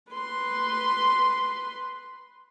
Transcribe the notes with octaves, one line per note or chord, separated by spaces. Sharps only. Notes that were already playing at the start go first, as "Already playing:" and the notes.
B4 C6